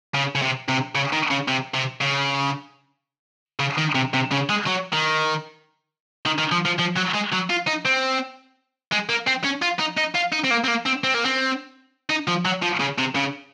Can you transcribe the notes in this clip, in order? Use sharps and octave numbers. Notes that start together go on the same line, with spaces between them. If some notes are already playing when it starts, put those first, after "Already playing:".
C#3
C#3
C3
C3
C#3
D#3
C#3
C3
C3
C#3
C#3
D#3
C3
C3
C#3
G#3
F#3
D#3
D#3
D#3
F3
F3
F3
F#3
G#3
F#3
F4
D#4
C4
G#3
A#3
C4
C#4
F4
D#4
D#4
F4
D#4
C4
A#3
C4
A#3
C4
C4
A#3
C4
D#4
F3
F#3
F3
C#3
C3
C#3